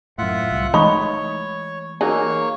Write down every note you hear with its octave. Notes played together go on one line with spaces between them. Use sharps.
F#2 A2 F4 E5 F#5
C2
E3 G#3 A3 D#4 C#5 A#5 B5 C#6
F#3 A#3 D#4 G#4 C#5